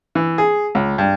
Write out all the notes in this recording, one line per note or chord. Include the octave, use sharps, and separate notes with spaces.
E3
G#4
C#2
G2